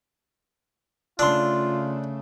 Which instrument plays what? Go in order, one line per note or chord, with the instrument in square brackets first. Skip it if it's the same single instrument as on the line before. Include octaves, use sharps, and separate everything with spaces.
[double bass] C#3 A3 [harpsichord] D4 [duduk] F4 [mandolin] C6 E6